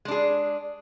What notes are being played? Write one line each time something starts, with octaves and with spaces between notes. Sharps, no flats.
G#3 D4 G#4